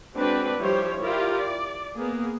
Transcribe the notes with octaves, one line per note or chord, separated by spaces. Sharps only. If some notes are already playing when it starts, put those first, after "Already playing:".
G#3 C4 D4 F#4 B4
F3 G3 E4 G4 C5 C#5
E4 F4 G4 A#4 D5
D5
A#3 B3 G#4